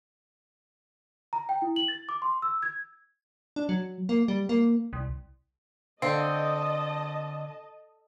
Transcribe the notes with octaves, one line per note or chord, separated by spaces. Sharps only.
A#5
G5
E4
F#7
A6
D6
C6
E6
G#6
D4
F#3
A#3
G3
A#3
C2
D3 C4 D#5 F5 A5